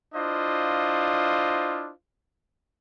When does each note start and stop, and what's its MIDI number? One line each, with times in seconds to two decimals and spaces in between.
0.15 1.92 62
0.15 1.92 64
0.15 1.92 65
0.15 1.92 72
0.15 1.92 75
0.15 1.92 77